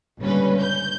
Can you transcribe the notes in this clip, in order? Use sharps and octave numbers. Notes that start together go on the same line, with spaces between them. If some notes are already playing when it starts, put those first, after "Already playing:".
G1 C#2 G2 A#2 C#4 B4
G6